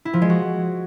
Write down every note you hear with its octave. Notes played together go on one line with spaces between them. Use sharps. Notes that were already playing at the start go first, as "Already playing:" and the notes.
E4
F3
G#3
F#4